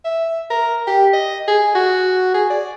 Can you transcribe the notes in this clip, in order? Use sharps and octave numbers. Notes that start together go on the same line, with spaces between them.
E5
A#4
G4
D#5
G#4
F#4
G#4
D5